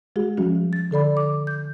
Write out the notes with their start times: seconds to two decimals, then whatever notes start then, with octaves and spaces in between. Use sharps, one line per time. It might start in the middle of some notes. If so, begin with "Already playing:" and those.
0.16 G#3 F#4 G#4
0.37 F3 G3 C#4 F#4
0.73 A6
0.91 D3 A4 D5 B5
1.17 D6
1.47 G6